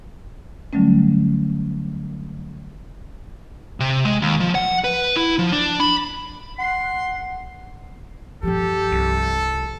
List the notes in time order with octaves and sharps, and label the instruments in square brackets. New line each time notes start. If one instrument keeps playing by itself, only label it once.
[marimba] D3 F#3 G3 A3 C#4
[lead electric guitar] C3
G#3
D#2
F3
F#5
B4
E4
F3
D4
B5
[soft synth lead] F#5 [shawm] C6
[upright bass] G2 F3 [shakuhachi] G4 [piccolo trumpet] A4
[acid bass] C2